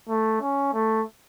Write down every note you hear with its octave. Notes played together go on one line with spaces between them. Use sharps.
A3
C#4
A3